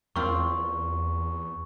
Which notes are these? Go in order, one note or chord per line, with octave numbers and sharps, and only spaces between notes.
E2 A#3 C4 F4 C#6